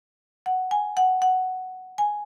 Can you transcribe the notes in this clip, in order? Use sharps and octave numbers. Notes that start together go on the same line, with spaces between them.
F#5
G#5
F#5
F#5
G#5